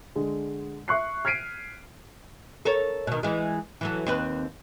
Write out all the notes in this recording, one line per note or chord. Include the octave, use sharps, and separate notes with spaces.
D3 G#3
E5 C#6 F#6 C7
F6 G#6 B6 C7 D7 D#7
A4 A#4 C#5
B2 D#3
E3 G#3
E3 F#3 A4
D#2 C4 B4